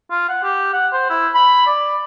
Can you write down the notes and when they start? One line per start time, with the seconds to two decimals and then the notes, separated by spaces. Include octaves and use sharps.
0.11 F4
0.29 F#5
0.43 G4
0.74 F#5
0.93 C5
1.10 E4
1.34 B5
1.67 D5